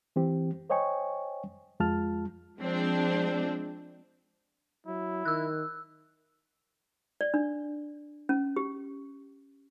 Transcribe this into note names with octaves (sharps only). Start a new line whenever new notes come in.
E3 C4 G4
C5 C#5 D#5 G5 G#5 C#6
F2 G#3 F4 A5 F6
F3 G#3 C4 D4
F#3 E4
D#3 E6 F#6
D5
D4
C#4
G4